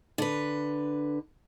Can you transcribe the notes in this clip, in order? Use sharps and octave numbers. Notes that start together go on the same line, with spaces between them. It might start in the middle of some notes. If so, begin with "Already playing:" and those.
D3 B4